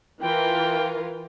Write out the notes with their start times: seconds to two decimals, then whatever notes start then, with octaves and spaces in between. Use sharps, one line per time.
0.21 E3 F4 A#4 G5